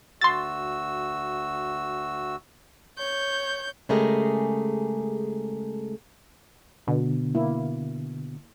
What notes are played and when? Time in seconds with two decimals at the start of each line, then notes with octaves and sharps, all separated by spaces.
0.21 D2 F#4 C6 E6 A6
2.98 C#5 G6
3.89 C#3 G#3 A3 G4 G#4 A#4
6.87 B2 D3
7.35 A#3 E4